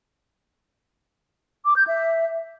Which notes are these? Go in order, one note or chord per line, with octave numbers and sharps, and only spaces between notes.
D6
G6
E5